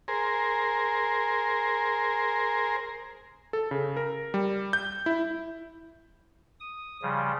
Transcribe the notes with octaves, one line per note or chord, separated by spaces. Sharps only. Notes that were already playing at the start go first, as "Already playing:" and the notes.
G#4 A#4 C5
A4
C#3
A#4
G3
G6
E4
D#6
C#3 F3 G3